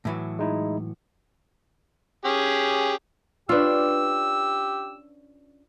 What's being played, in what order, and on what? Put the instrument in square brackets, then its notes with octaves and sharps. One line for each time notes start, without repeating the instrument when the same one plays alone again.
[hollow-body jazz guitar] A2 E3 F#3
[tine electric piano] G#3 D#4 E4
[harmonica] C#4 G4 G#4
[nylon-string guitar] C#4 D4 [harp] F4 B4 [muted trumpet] G4 [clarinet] E6